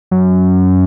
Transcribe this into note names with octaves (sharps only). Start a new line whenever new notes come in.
F#2